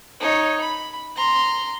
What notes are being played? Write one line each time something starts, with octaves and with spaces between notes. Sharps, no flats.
D#4 C#5
B5
A#5 C6